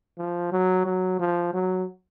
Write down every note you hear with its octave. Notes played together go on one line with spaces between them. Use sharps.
F3
F#3
F#3
F3
F#3